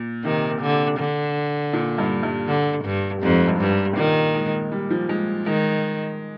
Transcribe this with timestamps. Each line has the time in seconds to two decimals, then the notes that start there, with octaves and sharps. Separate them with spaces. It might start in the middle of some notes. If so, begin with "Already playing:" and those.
Already playing: A#2
0.24 C3 D#3
0.61 D3
0.99 D3
1.73 A#2
1.98 G2
2.23 G2
2.48 D3
2.85 G2
3.23 F2 G#2
3.47 G2
3.60 G2
3.93 C3
3.97 A#2 D#3
4.34 G#3
4.72 G3
4.90 F3
5.09 G#3
5.46 D#3 G#3